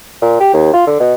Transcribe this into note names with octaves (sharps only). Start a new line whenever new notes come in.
A#2
G4
D#2
F4
D3
B2